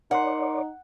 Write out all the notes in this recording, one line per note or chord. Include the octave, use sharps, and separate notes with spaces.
D#4 A#4 C#5 D5 F#5 C6